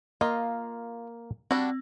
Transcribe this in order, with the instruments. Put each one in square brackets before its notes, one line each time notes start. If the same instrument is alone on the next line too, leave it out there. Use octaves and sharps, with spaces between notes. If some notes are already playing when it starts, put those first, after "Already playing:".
[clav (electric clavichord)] A#3 [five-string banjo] F4 D#5
[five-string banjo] G3 D4 F#4 [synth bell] C4